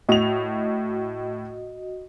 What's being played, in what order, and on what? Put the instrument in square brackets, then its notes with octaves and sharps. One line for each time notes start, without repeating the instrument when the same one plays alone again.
[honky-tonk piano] A2 F7 [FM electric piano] F#4 D#5